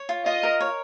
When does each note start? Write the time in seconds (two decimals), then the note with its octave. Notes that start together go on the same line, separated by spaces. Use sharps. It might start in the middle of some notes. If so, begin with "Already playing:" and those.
Already playing: C#5
0.09 F4
0.26 F4 D#5
0.43 A#4
0.60 C#5